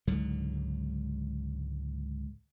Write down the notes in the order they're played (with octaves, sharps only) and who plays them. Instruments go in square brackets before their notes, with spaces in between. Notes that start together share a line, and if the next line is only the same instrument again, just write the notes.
[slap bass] C#2 G#2 D3 F#3